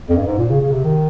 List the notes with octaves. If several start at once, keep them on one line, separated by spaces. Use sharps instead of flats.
F2
G2
G#2
A#2
C#3
C#3
C3
D#3